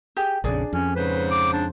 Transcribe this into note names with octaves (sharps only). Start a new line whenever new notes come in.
G4 G#4
A#1 F2 C#3 D4 G#4 D5
F2 C#4
G#2 C#3 B4 C5
D6
D4